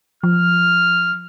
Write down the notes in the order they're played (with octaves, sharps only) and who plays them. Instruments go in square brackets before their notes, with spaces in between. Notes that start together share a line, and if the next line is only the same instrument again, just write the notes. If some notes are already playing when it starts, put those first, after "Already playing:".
[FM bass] F3 [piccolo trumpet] F6